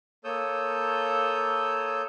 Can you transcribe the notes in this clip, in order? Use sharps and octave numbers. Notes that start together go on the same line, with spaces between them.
A#3 A4 C#5 D#6 E6 G6